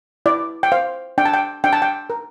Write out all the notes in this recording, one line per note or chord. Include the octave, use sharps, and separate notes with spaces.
E4 D5
G5
C5 F5
D4 G5
A5
G5
D4 G5
A5
G5
A#4